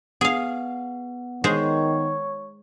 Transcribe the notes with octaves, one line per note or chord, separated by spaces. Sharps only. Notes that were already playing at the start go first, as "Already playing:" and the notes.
B3 G#4 F5
D#3 G#3 G#4 C5 C#5